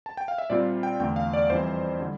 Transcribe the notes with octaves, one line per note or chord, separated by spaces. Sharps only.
A5
G5
F5
E5
A#2 G3 C4 F4 D5
G5
E2 D3 A3 G5
F5
D5
F2 E3 G3 C5
D3 G3